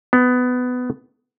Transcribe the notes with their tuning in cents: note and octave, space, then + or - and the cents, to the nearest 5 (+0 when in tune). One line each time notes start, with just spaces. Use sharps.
B3 +15